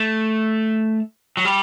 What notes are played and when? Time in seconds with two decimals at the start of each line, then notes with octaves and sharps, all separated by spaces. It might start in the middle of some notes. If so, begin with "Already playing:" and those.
Already playing: A3
1.37 F#3
1.45 G3